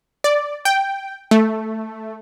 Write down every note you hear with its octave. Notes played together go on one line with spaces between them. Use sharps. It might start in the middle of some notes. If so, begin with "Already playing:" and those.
D5
G5
A3